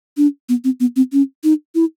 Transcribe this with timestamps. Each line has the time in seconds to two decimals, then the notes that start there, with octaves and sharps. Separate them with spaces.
0.17 D4
0.49 B3
0.64 C4
0.80 B3
0.96 C4
1.12 C#4
1.44 D#4
1.75 E4